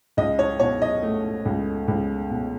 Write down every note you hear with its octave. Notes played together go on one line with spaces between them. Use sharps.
C#2 D#5
C#5
B2 C#5
D#5
A3
C#2
C#2
B2